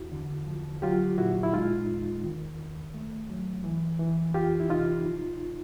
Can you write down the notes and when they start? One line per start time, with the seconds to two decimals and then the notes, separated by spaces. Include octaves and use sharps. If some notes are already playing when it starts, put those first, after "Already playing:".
Already playing: E2 E4 F#4
0.12 D3
0.47 F3
0.82 F#3 F4 G4
1.18 A#2 E4 F#4
1.43 E4
1.53 G#3 D#4 F4
1.89 E2
2.24 D#3
2.59 D2
2.94 A3
3.30 F#3
3.64 E3
3.99 E3
4.34 F2 F4 G4
4.60 E4
4.70 C3 D#4 F4
5.05 F3